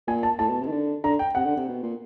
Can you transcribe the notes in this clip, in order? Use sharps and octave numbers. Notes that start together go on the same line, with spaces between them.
A#2 G#5
A5
A2 A5
B2
C3
D#3
D3
D3 A#5
G5
C3 F#5
D3
C3
B2
A#2